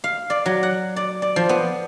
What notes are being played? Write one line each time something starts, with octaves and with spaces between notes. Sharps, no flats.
F5
D5
F#3
F#5
D5
D5
F3
B3